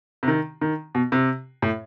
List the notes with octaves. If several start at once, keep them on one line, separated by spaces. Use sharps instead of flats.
C3
D#3
D#3
B2
C3
A2